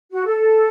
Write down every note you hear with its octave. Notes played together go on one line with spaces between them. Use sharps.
F#4
A4